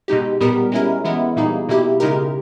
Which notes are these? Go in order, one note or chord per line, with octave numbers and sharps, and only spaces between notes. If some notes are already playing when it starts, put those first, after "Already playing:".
B2 G#3 D#4 G4
A#2 G3 B3 G4 A#4
G#3 C#4 E4 A#4
E3 G#3 B3 E4
A#2 G3 A#3 D#4 G#4
B2 A#3 E4 G4
C#3 G#3 D#4 G4 A#4